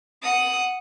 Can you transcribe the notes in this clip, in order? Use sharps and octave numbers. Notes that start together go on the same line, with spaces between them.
F#5 D#6